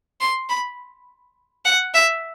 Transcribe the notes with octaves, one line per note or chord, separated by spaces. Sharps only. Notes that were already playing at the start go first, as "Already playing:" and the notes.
C6
B5
F#5
E5